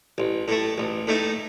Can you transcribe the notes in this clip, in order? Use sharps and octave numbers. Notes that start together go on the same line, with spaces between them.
A1
A2 A3
A1
A2 A3 D#4